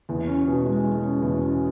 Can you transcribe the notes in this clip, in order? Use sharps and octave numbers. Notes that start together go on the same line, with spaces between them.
E2
C#4
B2
G#3
G#3
C#4
E2
C#4